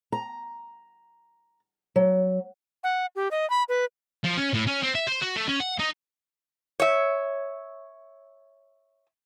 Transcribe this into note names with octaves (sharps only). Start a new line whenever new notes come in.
A#5
F#3
F#5
G4
D#5
B5
B4
F3
C#4
A2
C#4
C4
E5
C5
F#4
A3
C#4
F#5
D#4
C#5 E5